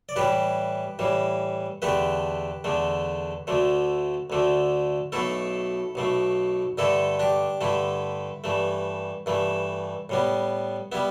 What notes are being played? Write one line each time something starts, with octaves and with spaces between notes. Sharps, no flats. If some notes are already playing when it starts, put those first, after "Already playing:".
D5
A2 E3 G3 G4 B4
A2 E3 G3
E2 D3 A3 G4 B4
E2 D3 A3
D2 D3 A3
D2 D3 A3
B1 B2 A3 E4 A4
B1 B2 A3
G2 D3 A3 E4 A4
D4 G4
G2 D3 A3 E4
G2 E3 A3
G2 E3 A3
A2 G3 B3
G3 B3 E4